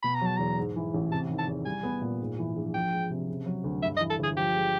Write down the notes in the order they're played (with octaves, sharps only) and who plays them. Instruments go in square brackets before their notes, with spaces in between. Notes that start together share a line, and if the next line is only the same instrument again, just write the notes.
[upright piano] B2 [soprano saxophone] B5
[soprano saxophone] A#5
[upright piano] F#3 [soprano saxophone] A5
[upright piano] E2 [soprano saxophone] A#5
[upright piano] G#2
E3
A1
[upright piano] C3 [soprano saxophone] A5
[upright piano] D#3
[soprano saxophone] A5
[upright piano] E2
[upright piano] G3 [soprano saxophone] G#5
[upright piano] B3
A#2
G#2
E3
A#1
[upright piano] F3 [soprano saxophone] G5
[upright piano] G#3
C3
C#3
F#3
D2
[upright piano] G2 [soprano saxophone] E5
[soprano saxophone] D#5
[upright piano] E3
[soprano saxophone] A4
[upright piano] G1 [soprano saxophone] G#4
[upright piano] F3 [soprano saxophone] G4
[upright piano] G#3